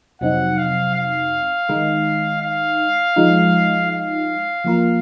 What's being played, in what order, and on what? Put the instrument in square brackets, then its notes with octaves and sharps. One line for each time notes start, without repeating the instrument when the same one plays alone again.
[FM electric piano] F2 C3 F#3 C4 D#4 [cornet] F#5
[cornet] F5
F5
[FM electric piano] D#3 G#3 D#4
[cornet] F5
[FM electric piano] F3 G#3 D#4
[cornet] F5
[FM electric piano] F3 A#3 F4 A#4